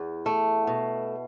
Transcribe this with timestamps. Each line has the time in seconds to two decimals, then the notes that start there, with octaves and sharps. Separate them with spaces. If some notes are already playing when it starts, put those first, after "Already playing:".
Already playing: E2
0.26 A3
0.67 B2